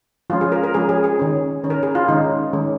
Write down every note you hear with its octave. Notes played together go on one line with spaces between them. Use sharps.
F3 G#3 C#4 F4
G#4
A#4
A#4
F3 G#3 C#4 G#4
G#4
G#4
D#3 C#4
D#3 C#4
A#4
G#4
F4
D#3 G#3 C#4 D#4
D#3 G#3 C#4